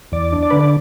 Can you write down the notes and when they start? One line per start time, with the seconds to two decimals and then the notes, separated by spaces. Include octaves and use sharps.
0.12 E2 D5
0.32 D4
0.43 D5
0.50 D3 B4
0.61 D5